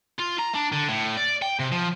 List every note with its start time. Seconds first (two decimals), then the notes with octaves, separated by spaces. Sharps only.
0.19 F4
0.39 A#5
0.55 D4
0.73 D3
0.89 A2
1.17 D5
1.42 G5
1.59 C3
1.72 F3